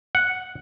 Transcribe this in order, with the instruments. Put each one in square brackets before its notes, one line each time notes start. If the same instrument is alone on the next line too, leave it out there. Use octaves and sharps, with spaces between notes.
[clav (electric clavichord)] F#5